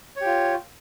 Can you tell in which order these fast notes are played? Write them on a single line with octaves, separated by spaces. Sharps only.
C#5 G4 F4